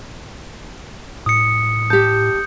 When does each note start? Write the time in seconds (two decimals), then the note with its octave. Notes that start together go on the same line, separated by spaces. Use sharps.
1.26 A2 D#6 C#7
1.90 G4 A5 G6